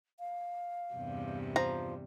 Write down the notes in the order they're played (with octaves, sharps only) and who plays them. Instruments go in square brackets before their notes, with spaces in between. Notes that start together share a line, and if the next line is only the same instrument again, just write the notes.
[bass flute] F5
[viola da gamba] E2 G2 C3
[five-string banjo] F3 A#5